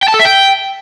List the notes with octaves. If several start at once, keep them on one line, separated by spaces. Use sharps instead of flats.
G5
A5
A4
E5
G5